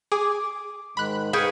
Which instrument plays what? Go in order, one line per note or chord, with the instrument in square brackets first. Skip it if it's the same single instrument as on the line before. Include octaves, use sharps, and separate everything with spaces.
[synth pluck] G#4 [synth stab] D6
[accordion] G#2 D#3 G#3 [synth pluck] B5 F#6
[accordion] G#2 F5 [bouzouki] G#4 [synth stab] B4 G5 C#6